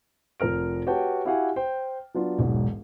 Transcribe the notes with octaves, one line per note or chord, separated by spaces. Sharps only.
F1 F3 A#4 F6 D7
F#4 G4 B4 C#5 G5 A5
E4 F#4 G4 F5 F#5 G#5
C5 G5
F#3 B3 D4 F4
E1 B1 G#2